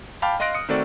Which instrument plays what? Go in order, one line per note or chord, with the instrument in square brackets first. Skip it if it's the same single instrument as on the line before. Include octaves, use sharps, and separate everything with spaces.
[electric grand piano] F5 G5 A5 B5 D6 F6
D#5 F5 C6 F#6 A#6 D7
D#6 C#7
D#3 A3 C4 F#4 A4 D5